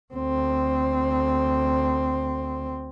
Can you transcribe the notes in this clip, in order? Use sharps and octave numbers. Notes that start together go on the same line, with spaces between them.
D2 C4